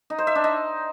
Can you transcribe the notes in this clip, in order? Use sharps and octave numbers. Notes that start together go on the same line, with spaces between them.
D#4
C5
E5
D4
D#4